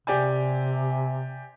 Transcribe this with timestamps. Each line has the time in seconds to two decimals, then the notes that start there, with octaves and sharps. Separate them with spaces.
0.07 C3 G4 D5 G#5